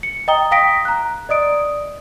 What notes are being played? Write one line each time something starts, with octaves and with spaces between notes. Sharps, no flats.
C#7
D#5 G5 A#5 D#6 G7
F5 G5 D#6 A#6 B6 D7
A#5 F#6
D5 D#5 D#6 D7